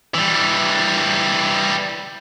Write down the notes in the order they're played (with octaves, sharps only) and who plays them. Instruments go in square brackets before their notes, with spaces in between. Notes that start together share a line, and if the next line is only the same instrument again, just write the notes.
[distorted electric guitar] E3 G3